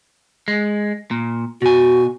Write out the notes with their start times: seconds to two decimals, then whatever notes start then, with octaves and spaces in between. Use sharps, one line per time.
0.48 G#3
1.11 A#2
1.62 B2 F#4 G#5